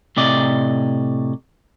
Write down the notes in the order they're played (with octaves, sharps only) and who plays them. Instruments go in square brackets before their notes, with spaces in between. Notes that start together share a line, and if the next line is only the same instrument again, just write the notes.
[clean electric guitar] A2 C3 D5 D#5